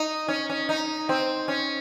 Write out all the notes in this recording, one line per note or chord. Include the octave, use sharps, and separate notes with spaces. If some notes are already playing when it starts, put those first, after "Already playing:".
Already playing: D#4
C#4
C#4
D#4
C4
C#4